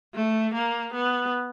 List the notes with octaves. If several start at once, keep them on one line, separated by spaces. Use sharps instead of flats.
A3
A#3
B3